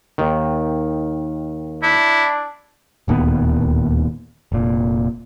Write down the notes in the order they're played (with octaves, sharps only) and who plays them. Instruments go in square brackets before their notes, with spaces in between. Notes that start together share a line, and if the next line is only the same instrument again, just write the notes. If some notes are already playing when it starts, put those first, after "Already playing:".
[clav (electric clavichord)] D#2 D#3
[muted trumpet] D4 [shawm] E4
[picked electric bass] D1 D#2 A#2 B3
F1 A#2